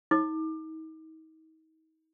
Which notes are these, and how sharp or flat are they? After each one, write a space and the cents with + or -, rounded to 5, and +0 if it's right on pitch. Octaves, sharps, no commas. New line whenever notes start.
D#4 +40 D6 +30